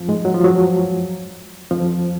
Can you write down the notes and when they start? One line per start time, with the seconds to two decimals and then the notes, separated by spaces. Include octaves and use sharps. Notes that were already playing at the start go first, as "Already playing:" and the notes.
Already playing: F2 F3
0.08 G#2 G#3
0.25 F#3
0.34 F3
0.44 F#2 F#3
1.70 F2 F3